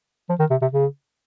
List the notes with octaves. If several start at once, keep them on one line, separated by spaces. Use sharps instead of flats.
F3
D#3
C3
C3
C#3